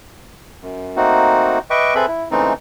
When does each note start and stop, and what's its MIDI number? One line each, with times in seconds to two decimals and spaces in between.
0.62 0.96 42
0.96 1.59 57
0.96 1.59 58
0.96 1.59 60
0.96 1.59 63
0.96 1.59 66
1.70 1.94 71
1.70 1.94 75
1.70 1.94 76
1.70 1.94 79
1.70 1.94 85
1.70 1.94 86
1.95 2.06 60
1.95 2.06 68
1.95 2.06 69
1.95 2.06 71
1.95 2.06 76
1.95 2.06 83
2.08 2.28 64
2.31 2.53 49
2.31 2.53 52
2.31 2.53 56
2.31 2.53 57
2.31 2.53 60
2.31 2.53 63